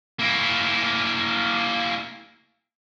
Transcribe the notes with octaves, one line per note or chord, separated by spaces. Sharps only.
A#3 E4